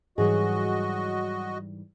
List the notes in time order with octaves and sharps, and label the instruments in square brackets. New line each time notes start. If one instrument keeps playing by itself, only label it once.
[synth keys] G#2 E3 G3 [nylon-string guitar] F#3 G#4 [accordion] F#4 D#5